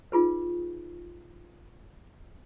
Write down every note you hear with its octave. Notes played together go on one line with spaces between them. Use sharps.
D#4 F4 G#4 B4